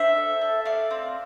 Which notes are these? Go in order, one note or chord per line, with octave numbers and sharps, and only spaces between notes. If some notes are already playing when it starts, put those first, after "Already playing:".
Already playing: D4 C5 E5
A4
A4
A3 D5 F5
C4